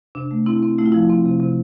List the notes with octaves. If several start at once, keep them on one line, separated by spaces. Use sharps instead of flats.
C3 D4
A3
C4 E4
C4
A3 E4
F4
F3 E4
C4
C3
C3